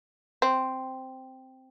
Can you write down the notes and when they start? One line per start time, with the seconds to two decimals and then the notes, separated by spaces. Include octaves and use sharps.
0.42 C4